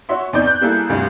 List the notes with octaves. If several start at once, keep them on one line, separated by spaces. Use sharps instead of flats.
F#4 C#5 E5 C6
E2 C4 D#4 D5 D6 G6
F#6 G6
G3 A#3 E4 G#4 A4
D2 G2 C3